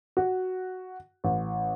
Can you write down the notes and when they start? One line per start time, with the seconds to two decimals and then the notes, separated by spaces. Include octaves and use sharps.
0.17 F#4
1.24 A1